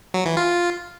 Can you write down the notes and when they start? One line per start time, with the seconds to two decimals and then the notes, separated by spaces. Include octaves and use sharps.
0.14 F#3
0.25 E3
0.37 F4